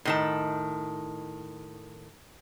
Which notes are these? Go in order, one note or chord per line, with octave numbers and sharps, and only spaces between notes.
A2 D#3 A5